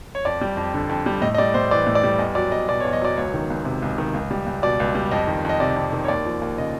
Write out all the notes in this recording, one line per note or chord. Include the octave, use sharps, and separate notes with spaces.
C#5
F2 D5
G3
F2
D3
F2
G3
A2 D#5
D#5
G3 D5
A2 C5
E3 D5
A2
D5
G3
E2 D#5
F#3 D5
E2 D#5
B2 D5
C#5
E2
D#5
F#3 D5
C#2 C#5
D#3
C#2
C3
C#2
D#3
C#2
G3
C#2
B2 D5
C#2
G3
F2 D#5
D#3
F2 D#5
C3 D5
F2
D#3
C#5
D#2 D5
F3
D#2
C#3 D#5